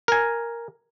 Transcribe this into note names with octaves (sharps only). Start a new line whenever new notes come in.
A#4 G#5